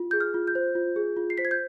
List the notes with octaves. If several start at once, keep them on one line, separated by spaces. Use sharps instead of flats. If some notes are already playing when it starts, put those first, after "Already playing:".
Already playing: F4
G#4 G6
F6
F4
G6
C5
F4
G#4
F4
C7
C5 B6
G#6
G6